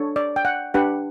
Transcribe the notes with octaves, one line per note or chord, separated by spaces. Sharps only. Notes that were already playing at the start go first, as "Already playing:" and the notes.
Already playing: D4 A4 C#5
D5
G5
F#5
D4 G4 B4 F#5